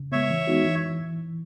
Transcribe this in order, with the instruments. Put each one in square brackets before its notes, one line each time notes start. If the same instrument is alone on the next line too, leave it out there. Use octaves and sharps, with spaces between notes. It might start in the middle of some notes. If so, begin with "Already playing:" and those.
Already playing: [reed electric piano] C#3
[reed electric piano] G#3 B3 [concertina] C#5 E5
[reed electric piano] E3
G#3 B3 D#4 F#4
E3